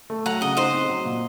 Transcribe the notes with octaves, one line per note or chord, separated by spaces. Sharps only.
A3
F#3 F#5 A#5
C#3 D#5 F#5
D#4 C5 D#5
C4
F#3
A#2